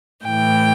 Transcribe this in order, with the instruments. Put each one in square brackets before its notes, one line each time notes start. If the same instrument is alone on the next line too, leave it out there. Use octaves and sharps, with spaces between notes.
[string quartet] A2 E3 G5